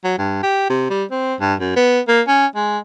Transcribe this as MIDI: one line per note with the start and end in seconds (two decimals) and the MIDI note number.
0.04 0.18 54
0.18 0.40 43
0.43 0.67 67
0.70 0.86 48
0.90 1.04 55
1.11 1.35 60
1.40 1.54 43
1.60 1.74 42
1.77 2.00 59
2.08 2.22 58
2.28 2.46 61
2.56 2.78 56